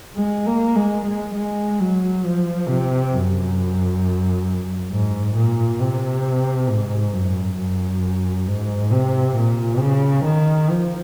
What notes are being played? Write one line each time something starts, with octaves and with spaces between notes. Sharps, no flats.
G#3
A#3
G#3
G#3
G#3
F#3
F3
C3
F#2
G#2
A#2
C3
G#2
F#2
F#2
G#2
C3
A#2
C#3
D#3
F3